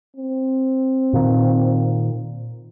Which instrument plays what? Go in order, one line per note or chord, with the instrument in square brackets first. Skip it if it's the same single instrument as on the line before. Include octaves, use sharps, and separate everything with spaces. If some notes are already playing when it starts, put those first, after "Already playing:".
[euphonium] C4
[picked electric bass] A#2 D#3